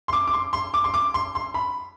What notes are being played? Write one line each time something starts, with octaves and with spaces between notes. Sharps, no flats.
C6
D6
D6
C6
C6
D6
C6
D6
C6
C6
B5